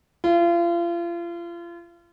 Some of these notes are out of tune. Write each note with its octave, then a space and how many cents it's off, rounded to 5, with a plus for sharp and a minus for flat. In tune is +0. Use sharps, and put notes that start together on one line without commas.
F4 -35